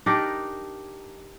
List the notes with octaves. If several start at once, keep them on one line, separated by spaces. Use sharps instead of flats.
D4 D#4 G4 A#4